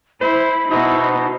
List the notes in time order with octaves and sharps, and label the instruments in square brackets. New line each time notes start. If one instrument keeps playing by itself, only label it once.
[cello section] E4 [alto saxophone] C5 [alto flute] B5
[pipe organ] B2 [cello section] B3 D#4 C5 [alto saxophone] E4